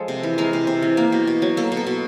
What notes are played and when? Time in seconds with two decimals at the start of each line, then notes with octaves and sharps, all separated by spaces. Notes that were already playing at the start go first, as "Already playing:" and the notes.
Already playing: F3 G#3 A4
0.08 C3
0.23 E3
0.38 G#3 A#4
0.53 C3
0.67 C3
0.82 E3
0.97 A#3
1.12 B2
1.27 B2
1.42 F#3
1.57 A#3 A4
1.72 B2
1.77 A4
1.87 B2